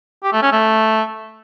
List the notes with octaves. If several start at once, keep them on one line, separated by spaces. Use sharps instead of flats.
G4
A3
C#4
A3